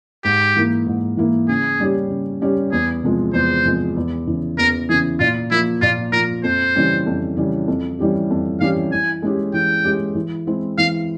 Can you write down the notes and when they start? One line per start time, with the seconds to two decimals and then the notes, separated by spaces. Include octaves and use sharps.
0.24 G#2 G4
0.56 E3 A#3 E4
0.87 G#2
1.17 E3 A#3 E4
1.48 C#3 G#4
1.79 G3 C#4 G4
2.10 C#3
2.41 G3 C#4 G4
2.72 E2 G#4
3.03 C3 F3 G#3
3.33 E2 C5
3.65 C3 F3 G#3
3.96 E2
4.27 C#3 E3
4.58 E2 A#4
4.89 C#3 E3 G#4
5.20 A#2 F4
5.51 F3 A#3 E4
5.81 A#2 F4
6.12 F3 A#4
6.17 A#3
6.44 F2 C5
6.75 C#3 E3 G3 C#4
7.06 F2
7.36 C#3 E3 G3 C#4
7.68 F2
7.99 E3 G3 C#4 G4
8.30 F2
8.60 E3 G3 C#4 G4 F5
8.92 E3 G#5
9.22 G#3 C#4 G4
9.54 E3 G5
9.84 G#3 C#4 G4
10.15 E3
10.47 G#3 C4 E4
10.78 E3 F5